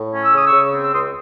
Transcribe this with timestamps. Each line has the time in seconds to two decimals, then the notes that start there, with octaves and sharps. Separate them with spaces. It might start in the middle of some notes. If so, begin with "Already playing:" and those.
Already playing: A2
0.12 C#4
0.23 E6
0.32 C#3 D#6
0.46 C#6 E6
0.52 C#3
0.72 C4
0.82 E6
0.93 C#2 C6 D#6